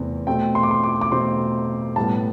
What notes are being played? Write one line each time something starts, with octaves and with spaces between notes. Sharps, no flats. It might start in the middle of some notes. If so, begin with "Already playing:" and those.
Already playing: E2 C3 E3 A3 C4
B2 A3 C4 G5
C6
D6
C6
D6
D6
B2 A3 C4 C6
A2 G3 B3 A5